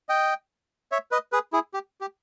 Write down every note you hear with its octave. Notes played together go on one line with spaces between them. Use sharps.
D#5 G5
C#5 E5
B4 D#5
G#4 B4
E4 G#4
G4
G4